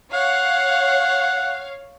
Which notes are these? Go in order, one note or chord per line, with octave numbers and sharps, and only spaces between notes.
C#5 F5 F#5